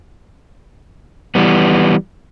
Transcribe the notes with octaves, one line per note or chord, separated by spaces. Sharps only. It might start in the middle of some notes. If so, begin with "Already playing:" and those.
E3 G3 B3